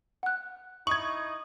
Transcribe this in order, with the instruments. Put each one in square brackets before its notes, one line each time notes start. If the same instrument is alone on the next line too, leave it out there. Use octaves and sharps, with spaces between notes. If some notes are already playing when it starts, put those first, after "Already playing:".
[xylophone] F#5 F#6
[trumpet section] D#4 E4 D#6 [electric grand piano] C#6 G#6 [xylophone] F#7